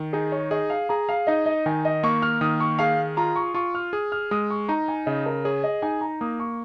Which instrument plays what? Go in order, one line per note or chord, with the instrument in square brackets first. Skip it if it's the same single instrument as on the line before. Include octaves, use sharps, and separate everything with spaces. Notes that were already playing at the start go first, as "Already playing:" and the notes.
Already playing: [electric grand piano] D#3
[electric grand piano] D#4 [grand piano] G#4
[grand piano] C#5
[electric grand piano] G#4 [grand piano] D#5
[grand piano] F5
[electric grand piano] G#4 [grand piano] A#5
[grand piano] F5
[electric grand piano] D#4 [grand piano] D#5
[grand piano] D#5
[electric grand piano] D#3 [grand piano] G#5
[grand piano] D#5
[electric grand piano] A#3 [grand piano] C#6
[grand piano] F6
[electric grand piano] D#3 [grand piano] D#6
[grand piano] C#6
[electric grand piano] G#4 [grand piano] F5
[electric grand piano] F4 [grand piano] A#5
[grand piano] C#6
[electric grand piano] F4 [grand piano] C#6
[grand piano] F6
[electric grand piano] G#4 [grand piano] D#6
[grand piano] F6
[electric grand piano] G#3 [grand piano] D#6
[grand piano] C#6
[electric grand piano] D#4 [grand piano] A#5
[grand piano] G#5
[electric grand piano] C#3 [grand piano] D#5
[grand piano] A#4
[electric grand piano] G#4 [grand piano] C#5
[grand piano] D#5
[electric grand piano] D#4 [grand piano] G#5
[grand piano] A#5
[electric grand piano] A#3 [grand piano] D#6
[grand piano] C#6